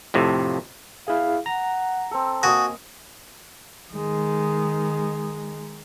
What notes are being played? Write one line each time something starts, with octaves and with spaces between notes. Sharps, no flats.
F2 A2 C3
E4 G#4 F5
F#5 A#5
C4 A4
A#3 F#4 D#5 G#5 D#6
D#3 G#3